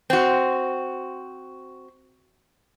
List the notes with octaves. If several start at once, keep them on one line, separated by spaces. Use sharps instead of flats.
C4 F#4